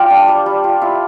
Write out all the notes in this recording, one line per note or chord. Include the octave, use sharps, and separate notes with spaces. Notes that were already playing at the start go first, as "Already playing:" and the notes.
Already playing: G3 F4 G4 C5
D4
G3
G3
F4
E4 F4